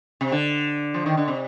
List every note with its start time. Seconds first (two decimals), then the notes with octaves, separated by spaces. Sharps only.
0.21 C3
0.32 D3
0.94 F3
1.06 D#3
1.17 D3
1.28 C3